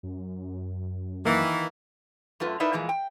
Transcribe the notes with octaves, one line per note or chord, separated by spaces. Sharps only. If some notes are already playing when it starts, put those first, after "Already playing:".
F#2
D#3 E3 A#3
F#2 A3 F4 B4
D#4 E4 A#4 B4 D5 E5
A#2 E3 F3 G#3
G5